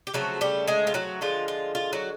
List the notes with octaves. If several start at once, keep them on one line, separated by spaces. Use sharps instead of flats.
G4
C#3 F3 F#3 A3 C4 F#4
G3 G4
G#3 G#4
F4
F#3 F#4
D3 F3 G#3 F4
F4
F4
F#3 F#4